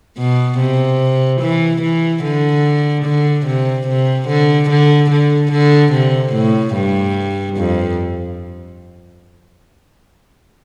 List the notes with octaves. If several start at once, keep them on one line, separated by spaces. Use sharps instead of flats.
B2
C3
E3
E3
D3
D3
C3
C3
D3
D3
D3
D3
C3
A2
G2
F2